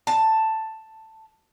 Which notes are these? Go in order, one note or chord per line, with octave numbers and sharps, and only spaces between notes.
A5